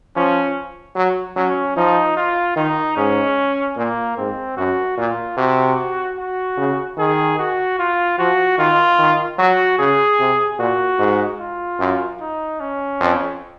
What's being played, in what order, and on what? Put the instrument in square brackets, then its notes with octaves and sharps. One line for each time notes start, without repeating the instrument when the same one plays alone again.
[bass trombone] F3 [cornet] C#4
[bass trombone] F#3
[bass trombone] F#3 [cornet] C#4
[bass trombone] F3 [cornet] D#4
[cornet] F4
[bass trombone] D#3 [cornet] D#4
[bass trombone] G#2 [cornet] C#4
[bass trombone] A#2 [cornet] A#3
[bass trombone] G#2 [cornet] C4
[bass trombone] F#2 [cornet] F#4
[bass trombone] A#2 [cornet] F4
[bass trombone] C3 [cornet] F#4
[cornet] F#4
[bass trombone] C#3
[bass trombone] D#3 [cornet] G#4
[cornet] F#4
F4
[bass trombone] F3 [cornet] F#4
[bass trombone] D#3 [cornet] F4
[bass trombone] D#3
[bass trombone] F#3 [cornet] F#4
[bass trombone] C#3 [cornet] G#4
[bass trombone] C3
[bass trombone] A#2 [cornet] F#4
[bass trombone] G#2
[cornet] F4
[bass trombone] F#2
[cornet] D#4
C#4
[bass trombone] F2